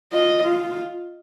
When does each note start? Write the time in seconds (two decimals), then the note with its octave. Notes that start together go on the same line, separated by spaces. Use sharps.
0.12 F4 D#5
0.44 F4